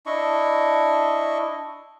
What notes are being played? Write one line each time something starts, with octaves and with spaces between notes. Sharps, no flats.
D4 E4 D#5 C#6